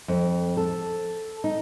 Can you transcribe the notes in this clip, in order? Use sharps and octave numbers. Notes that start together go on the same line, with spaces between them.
F2
A4
D#4